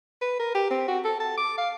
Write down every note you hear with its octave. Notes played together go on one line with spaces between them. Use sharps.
B4
A#4
G4
C4
F#4
A4
A5
D6
F5